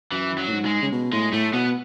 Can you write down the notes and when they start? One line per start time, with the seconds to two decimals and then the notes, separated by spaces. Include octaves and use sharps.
0.11 F#2 E3
0.38 F#3
0.47 A2
0.52 G#2
0.65 G#3
0.82 C#3
0.92 B2
1.13 A2 G#3
1.32 A2 A3
1.53 B2 B3